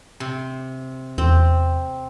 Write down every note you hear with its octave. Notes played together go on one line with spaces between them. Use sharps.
C3
E2 C4